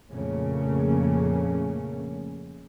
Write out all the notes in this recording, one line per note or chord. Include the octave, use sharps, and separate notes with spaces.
F2 A#2 C#3 A3 A#3 C#4